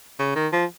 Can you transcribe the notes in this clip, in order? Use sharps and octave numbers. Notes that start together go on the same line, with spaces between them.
C#3
D#3
F3